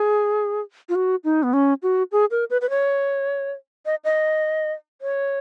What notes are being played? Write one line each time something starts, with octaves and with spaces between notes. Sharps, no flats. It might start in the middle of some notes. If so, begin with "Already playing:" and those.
Already playing: G#4
F4
F#4
D#4
B3
C#4
F#4
G#4
A#4
B4
B4
C#5
D#5
D#5
C#5